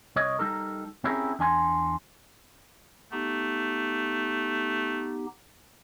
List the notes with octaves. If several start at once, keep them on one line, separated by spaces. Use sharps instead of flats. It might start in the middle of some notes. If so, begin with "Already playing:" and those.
C2 C#5 D#5
G3 D#4 A4 A#4
C4 C#4 E4 G4 G#4 A#4
E2 D4 G#5 C6
A3 B3 D#4 G4